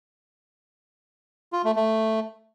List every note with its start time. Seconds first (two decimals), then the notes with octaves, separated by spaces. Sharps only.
1.53 F4
1.64 A3
1.76 A3